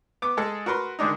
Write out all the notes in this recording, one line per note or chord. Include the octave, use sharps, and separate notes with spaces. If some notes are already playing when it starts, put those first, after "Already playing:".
B3 D6
G#3 G#4 A4
F#4 A#4 B4 C6
D3 D#3 G#3 D4 D#4